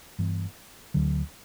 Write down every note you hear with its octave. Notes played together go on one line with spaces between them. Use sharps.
G2 E3 B3
D2 D3 F#3